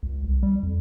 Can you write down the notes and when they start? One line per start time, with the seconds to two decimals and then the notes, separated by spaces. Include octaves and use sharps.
0.03 C#2
0.24 C2
0.43 G3
0.63 F2